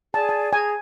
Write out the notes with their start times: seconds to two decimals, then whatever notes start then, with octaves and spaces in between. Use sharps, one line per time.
0.14 G#4 D5 G#5 A5
0.29 A5
0.53 G#4 G#5 A#5